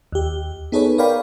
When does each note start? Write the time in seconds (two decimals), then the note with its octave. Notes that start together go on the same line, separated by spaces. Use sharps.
0.12 D#2 G4
0.72 B3 D#4 G#4 A4 B4 C#5
0.98 A#4 C#5 D5 F5 G5 B5